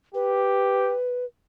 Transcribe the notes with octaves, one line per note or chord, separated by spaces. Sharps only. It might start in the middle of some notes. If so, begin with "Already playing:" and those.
G4 B4